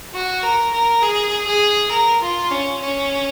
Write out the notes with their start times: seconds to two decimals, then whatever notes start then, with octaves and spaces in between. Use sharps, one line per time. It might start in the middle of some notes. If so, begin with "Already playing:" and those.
0.14 F#4
0.43 A#4
0.73 A#4
1.03 G#4
1.47 G#4
1.91 A#4
2.22 F4
2.51 C#4
2.81 C#4